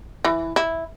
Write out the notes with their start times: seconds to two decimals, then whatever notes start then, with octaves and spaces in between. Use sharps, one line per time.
0.25 E3
0.56 E4